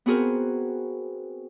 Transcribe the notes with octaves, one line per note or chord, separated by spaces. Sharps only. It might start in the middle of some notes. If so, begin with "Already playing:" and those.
B3 C4 F#4 G#4 A#4 C5